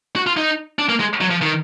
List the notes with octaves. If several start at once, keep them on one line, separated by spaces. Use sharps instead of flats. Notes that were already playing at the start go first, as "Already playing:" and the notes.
F#4
F4
D#4
D4
A#3
G#3
F#3
F3
D#3